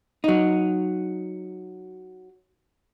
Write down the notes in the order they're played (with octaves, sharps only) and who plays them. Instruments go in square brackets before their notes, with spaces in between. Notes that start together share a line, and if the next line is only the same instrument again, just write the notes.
[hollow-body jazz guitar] F#3 D#4